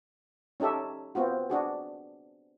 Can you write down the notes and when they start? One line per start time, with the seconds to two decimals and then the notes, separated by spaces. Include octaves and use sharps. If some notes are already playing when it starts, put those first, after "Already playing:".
0.60 C#4 D#4 G4 A4 E5
1.15 B3 C4 F4 F#4
1.50 D4 F#4 G#4